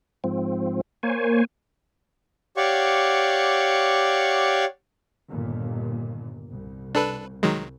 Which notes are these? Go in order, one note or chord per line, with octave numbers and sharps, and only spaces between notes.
G#2 F3 C4
A#3 C5 C#5 G#5
G4 C#5 D5 F5 F#5 C#6
G1 D#2 A#2
C2
D4 A4 B4
D#3 F#3 G#3